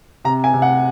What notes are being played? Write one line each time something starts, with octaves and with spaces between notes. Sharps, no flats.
C3 A#5
G#5
C3
F#5